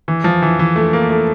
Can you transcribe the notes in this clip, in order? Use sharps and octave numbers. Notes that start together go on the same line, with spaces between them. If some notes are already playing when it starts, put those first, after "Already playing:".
E3
F3
E3
E3
A3
A#3
A3